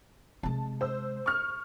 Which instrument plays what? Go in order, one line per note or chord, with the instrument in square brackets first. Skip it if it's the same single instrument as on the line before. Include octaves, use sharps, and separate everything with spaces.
[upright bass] C3 G#3 [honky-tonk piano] A5
[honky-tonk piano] C5 E6
C#6 F6